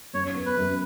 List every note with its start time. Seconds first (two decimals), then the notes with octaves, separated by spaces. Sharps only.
0.13 F#2 C#5
0.35 B3
0.46 B4
0.57 F#2